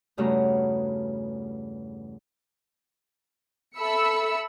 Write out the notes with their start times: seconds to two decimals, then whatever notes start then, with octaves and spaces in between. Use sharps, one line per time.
0.17 E2 G2 C#3 A3 F#4 A#5
3.78 A4 E5 B5 E6 C#7